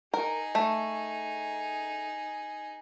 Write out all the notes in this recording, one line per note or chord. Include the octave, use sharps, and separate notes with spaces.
D#4 G#4 A#4
A3